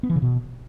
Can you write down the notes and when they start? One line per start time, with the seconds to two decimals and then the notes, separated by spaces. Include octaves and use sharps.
0.03 B3
0.10 E3
0.16 C#3
0.22 B2